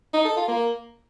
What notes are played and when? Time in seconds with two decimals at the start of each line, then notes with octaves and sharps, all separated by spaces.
0.14 D#4
0.25 A4
0.37 F4
0.48 A#3